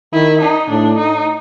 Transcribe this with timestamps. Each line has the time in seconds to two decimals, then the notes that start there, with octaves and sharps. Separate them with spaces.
0.13 D#3 E4
0.42 D#4
0.70 A2 D4
0.98 D#4